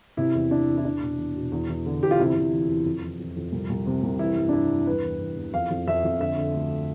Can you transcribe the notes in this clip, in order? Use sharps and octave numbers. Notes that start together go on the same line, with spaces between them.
C3 E4
E2
E2 D4
E2
E4
E2 D4
B2
E2
B2
E2
E2
D3
E2 G4
F4
C3 E4
C3
E3
E2
F2
E3
F2
F2
C2
C2
C3
C2
E3 E4
G2
D4
G2 E4
G2
E2 B4
E2
E2
E2
F2 F5
F2
F2 E5
F2
D3 E5
D3
D2